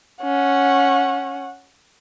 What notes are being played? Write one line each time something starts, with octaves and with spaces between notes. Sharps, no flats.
C#4 F#5